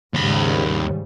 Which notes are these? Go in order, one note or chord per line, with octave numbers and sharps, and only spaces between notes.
D#2 G#2 C#3 G3 B5